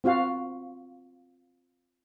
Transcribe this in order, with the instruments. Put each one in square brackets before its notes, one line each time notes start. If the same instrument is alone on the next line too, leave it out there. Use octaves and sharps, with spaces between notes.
[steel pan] C4 F4 F#4 F5